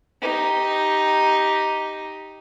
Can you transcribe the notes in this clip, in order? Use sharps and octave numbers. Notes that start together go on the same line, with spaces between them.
D#4 G4